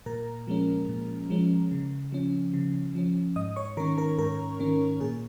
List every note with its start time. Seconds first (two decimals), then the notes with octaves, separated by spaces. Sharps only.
0.06 A#2 A#4 A#5
0.47 F3 G#3 C#4
0.89 A#2
1.30 F3 G#3 C#4
1.72 C#3
2.12 F3 C#4
2.53 C#3
2.95 F3 C#4
3.36 G#2 D#5 D#6
3.56 C#5 C#6
3.77 D#3 C#4 A#4 A#5
3.98 A#4 A#5
4.18 G#2 A#4 A#5
4.60 D#3 C#4
5.00 A#2 G#4